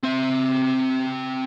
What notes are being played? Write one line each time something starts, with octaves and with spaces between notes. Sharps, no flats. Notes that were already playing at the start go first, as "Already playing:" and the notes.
C4 E5